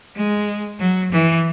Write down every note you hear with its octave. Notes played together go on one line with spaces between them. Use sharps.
G#3
F#3
E3